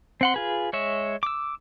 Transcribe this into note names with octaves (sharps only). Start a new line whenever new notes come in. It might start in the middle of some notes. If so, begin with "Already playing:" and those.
C4 F#5 C6
F4 G#4 B4
G#3 C#5 E5
D6 E6